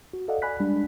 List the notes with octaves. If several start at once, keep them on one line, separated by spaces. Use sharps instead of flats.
F#4
A4 D5 D#5 F5 F#5
D5 G#5 B5 F#6 B6
G3 G#3 D4